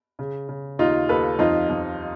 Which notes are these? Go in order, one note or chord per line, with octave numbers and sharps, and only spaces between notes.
C#3
C#3
D#2 D#4 F4
D#2 A4 B4
F2 D#4 F4
F2